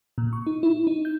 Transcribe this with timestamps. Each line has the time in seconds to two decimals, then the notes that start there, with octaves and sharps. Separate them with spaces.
0.18 A#2
0.33 C#6
0.47 D#4
0.63 E4
0.87 D#4
1.05 G6